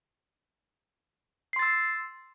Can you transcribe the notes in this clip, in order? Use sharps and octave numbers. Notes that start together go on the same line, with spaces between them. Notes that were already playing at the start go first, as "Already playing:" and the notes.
C6 E6 A6 C7